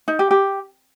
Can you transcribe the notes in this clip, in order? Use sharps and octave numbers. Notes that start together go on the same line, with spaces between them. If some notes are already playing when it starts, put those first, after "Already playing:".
D#4
G4
G4